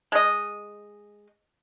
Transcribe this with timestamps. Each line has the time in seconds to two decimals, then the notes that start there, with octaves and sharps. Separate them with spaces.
0.12 G#3 D#5